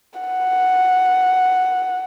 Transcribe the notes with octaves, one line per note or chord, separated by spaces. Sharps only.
F#5